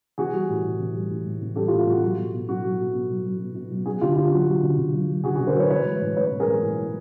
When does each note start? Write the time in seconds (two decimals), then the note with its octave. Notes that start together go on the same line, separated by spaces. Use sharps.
0.18 E3 F#4 G#4
0.33 G3
0.49 A2
0.64 A2
0.79 E3
0.95 G3
1.10 A2
1.26 A2
1.41 E3
1.56 G3 G4 A4
1.68 F4 G4
1.72 A2
1.79 F4
1.87 A2 F#4
2.02 F#3
2.17 B2
2.33 B2
2.48 F#3 F#4
2.64 F#3
2.79 B2
2.94 B2
3.09 F#3
3.25 F#3
3.40 B2
3.55 B2
3.71 F#3
3.86 F#3 F#4 G#4
4.01 D3 F4 G4
4.16 D3 F4
4.32 F#3 F#4
4.47 F#3
4.63 D3
4.78 D3
4.94 F#3
5.09 F#3
5.24 D3 F#4 G#4
5.36 F#4 G#4
5.40 D3
5.47 A#4 C5
5.56 F#3 B4 C#5
5.70 E3 B4 C#5
5.85 G#3
6.00 A2
6.16 A2 B4 C#5
6.31 E3
6.40 G#4 A#4
6.46 G#3
6.62 A2
6.78 A2